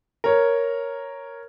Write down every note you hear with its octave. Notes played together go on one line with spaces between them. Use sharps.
A#4 C#5